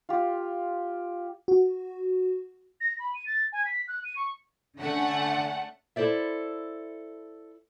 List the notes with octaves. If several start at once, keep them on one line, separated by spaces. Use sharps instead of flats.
F4 G4
F#4
A#6
B5
D#7
A6
G#5
B6
F#6
D#7
C#6
D3 A3 C#4 F#5
E4 A4 C5 D5 E5